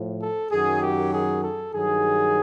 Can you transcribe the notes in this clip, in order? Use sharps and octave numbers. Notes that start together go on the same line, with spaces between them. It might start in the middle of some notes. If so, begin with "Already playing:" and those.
Already playing: A2 F3
A4
F#2 D#3 F#3 G#4
G4
G#4
A4
G2 D#3 F#3 G#4